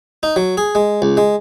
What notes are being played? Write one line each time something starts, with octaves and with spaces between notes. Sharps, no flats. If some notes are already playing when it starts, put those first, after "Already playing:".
D#4
F#3
G#4
G#3
C#2
G#3